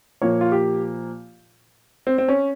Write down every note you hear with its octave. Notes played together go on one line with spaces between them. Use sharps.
A#2 F3 A#3 C#5
F4
G4
C4
C4
C#4